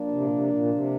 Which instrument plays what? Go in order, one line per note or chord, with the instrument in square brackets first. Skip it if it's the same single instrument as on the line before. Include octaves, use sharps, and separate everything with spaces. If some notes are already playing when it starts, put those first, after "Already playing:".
Already playing: [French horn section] F3 A#3 D4
[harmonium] C3
A#2
C3
A#2
C3